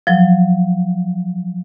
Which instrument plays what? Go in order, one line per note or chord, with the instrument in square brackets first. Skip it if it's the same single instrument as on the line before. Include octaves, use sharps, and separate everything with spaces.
[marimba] F3 F#3